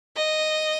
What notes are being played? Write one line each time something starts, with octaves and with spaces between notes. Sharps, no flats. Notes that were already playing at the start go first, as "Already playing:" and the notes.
D#5